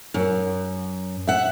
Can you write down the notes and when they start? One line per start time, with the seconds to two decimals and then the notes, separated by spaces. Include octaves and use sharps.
0.14 F#2
1.27 E5 F#5